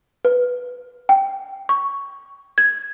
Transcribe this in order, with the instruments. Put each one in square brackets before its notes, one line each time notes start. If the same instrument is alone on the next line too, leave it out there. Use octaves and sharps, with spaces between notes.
[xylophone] B4
G5
C#6
G#6